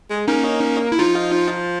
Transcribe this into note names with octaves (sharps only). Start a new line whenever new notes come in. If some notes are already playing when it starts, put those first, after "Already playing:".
G#3
A#3 C#4 D#4
E4
F3 D#4 F4